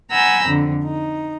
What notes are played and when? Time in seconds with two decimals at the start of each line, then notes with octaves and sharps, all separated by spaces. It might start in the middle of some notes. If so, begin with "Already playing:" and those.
0.11 F#5 G#5 A#5 B5 E6 G6
0.44 F2 D3
0.83 D#4